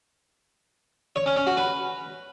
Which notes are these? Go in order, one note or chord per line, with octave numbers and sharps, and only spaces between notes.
C#5
C#4
C#4
F#4
B4